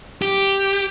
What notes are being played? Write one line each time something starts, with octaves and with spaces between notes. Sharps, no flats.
G4